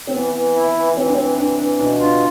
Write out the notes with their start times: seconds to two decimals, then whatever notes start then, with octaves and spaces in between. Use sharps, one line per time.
0.07 C4
0.14 E3 B3
0.34 E3
0.55 E4
0.76 E3
0.97 E3 C4
1.06 D4
1.15 E3 C4
1.38 E3 D4
1.59 E3 D4
1.79 B2 D4
2.00 D4 F4